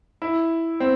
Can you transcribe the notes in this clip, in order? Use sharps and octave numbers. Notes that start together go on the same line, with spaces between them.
E4
C4